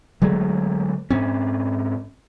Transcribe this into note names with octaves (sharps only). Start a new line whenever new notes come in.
D3 F#3 G#3 A3
G#2 C4 C#4